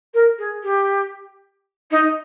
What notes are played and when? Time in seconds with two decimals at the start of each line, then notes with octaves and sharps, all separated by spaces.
0.14 A#4
0.38 G#4
0.63 G4
1.91 D#4